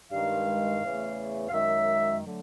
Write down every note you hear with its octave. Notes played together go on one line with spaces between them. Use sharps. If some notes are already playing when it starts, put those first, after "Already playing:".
G2 D#3 G#3 F5
E2 C#3 E3 A3
F5
F#2 D#3 G#3 E5
D3 F#3 A3